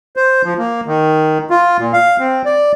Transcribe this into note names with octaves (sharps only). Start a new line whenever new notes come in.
C5
F3
A#3
D#3
F4
A#2
F5
C4
D5